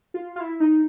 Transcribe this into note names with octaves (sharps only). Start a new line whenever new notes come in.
F4
F4
E4
D#4